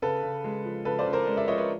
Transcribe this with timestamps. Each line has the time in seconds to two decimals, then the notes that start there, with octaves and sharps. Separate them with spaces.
0.02 C#3 A4 B4
0.23 C#3
0.44 G#3
0.65 F3
0.85 C#3 A4 B4
0.99 C5 D5
1.06 C#3
1.13 A#4 C5
1.27 G#3
1.37 D5 E5
1.48 F3 C#5 D#5
1.58 B4 C#5